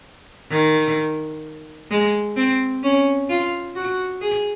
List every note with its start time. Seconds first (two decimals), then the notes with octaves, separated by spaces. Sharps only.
0.51 D#3
1.91 G#3
2.36 C4
2.83 C#4
3.30 F4
3.76 F#4
4.21 G#4